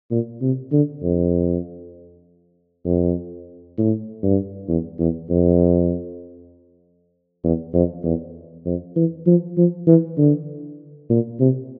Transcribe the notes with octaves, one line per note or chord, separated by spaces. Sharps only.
A#2
C3
D3
F2
F2
A2
G2
E2
E2
F2
E2
F2
E2
F2
E3
F3
F3
E3
D3
A#2
C3